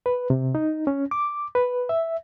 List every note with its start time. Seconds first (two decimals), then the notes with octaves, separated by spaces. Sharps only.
0.06 B4
0.30 C3
0.55 D#4
0.87 C#4
1.11 D6
1.55 B4
1.89 E5